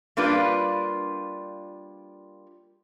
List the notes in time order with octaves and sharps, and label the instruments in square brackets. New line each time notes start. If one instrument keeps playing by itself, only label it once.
[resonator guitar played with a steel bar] G3 A#3 D4 F4 B4